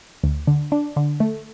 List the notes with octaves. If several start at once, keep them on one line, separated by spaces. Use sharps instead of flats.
D2
D3
D4
D3
A3